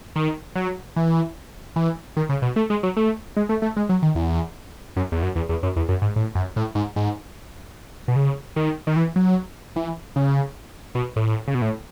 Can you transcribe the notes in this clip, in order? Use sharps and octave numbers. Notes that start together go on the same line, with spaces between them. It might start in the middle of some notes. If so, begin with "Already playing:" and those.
D#3
F#3
E3
E3
D#3
C#3
B2
A3
G#3
F#3
A3
G#3
A3
A3
G#3
F#3
D#3
E2
F#2
E2
F#2
E2
E2
F#2
E2
F#2
G#2
A2
F#2
A2
G#2
G#2
B2
C#3
D#3
D#3
E3
F#3
E3
C#3
B2
A2
C#3
B2
A2